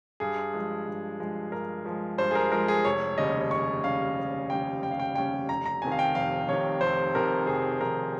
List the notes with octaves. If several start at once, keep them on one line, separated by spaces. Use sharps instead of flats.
G2 G#4
F3 G#3
G2
F3 G#3
G2 A#4
F3 G#3
G2 C5
G#4
A#4
F3 G#3 A#4
G#4
F1 C#5
D#2 C#3 G3 C#4 D#5
F1 C#6
D#2 C#3 G3 C#4 F5
F1
D#2 C#3 G3 C#4 G5
F1 G5
F5
G5
D#2 C#3 G3 C#4 G5
F1 A#5
A#5
F2 C3 D#3 G#5
F5
G5
F1 F5
F2 C3 D#3 C#5
F1 C5
F2 C3 D#3 A#4
F1 G#4
F2 C3 D#3 A#4